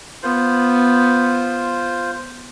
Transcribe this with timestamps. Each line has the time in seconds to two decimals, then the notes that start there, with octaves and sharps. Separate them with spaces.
0.23 B3 F4 C5